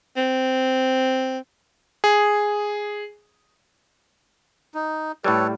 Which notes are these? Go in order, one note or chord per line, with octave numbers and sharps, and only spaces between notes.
C4
G#4
D#4
A2 G3 A4 B4 C#5